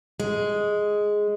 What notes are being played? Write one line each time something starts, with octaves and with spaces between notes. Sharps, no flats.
G#3